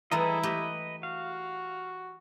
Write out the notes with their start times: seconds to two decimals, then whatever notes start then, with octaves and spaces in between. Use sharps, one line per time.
0.11 E3 G3 A3 E4 G#4 A4 D#5 A#5
0.43 A3 G4 B4 D#5 E5
1.03 F#4 F5